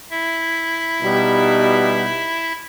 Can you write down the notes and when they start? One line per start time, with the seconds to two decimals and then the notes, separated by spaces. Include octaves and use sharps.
0.11 E4 E5
1.02 B2 G3 D#4